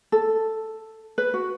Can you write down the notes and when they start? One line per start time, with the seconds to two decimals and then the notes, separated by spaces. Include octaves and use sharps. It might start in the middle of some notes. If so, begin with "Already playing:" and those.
0.12 A4
1.18 B4
1.34 F#4